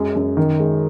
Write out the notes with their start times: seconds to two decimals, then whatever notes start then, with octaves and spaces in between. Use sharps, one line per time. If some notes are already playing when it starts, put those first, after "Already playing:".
Already playing: F#2 G#3
0.16 F#2
0.37 D#3
0.60 G#3